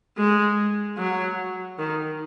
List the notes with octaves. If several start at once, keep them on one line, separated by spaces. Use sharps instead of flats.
G#3
F#3
D#3